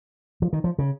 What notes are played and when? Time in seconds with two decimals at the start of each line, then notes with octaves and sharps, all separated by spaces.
0.42 F3
0.53 D#3
0.64 F3
0.79 C#3